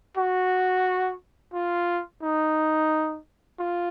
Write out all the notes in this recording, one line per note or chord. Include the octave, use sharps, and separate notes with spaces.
F#4
F4
D#4
F4